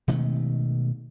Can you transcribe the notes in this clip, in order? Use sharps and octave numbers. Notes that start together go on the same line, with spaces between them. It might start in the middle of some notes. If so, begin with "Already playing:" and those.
B2 D#3 G#3 A3